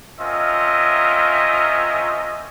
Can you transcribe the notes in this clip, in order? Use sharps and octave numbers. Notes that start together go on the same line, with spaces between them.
C4 C#4 F4 A#4 D#5 E5